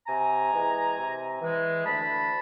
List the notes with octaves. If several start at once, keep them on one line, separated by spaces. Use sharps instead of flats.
C3 G#5 A#5
E3 G#3
C3
E3 G#3
D2 A5 B5